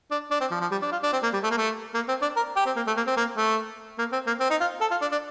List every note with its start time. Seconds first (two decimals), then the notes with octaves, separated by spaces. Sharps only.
0.11 D4
0.31 D4
0.40 C4
0.51 F3
0.61 F3
0.71 G3
0.82 D4
0.92 F4
1.03 D4
1.13 C4
1.23 A#3
1.33 G3
1.43 A3
1.51 A#3
1.57 A3
1.94 A#3
2.08 C4
2.22 D4
2.36 A#4
2.56 G4
2.66 C4
2.76 A#3
2.87 A3
2.97 A#3
3.07 C4
3.17 A#3
3.37 A3
3.98 A#3
4.12 C4
4.27 A#3
4.40 C4
4.50 D#4
4.60 F4
4.81 A4
4.91 F4
5.01 D4
5.11 D4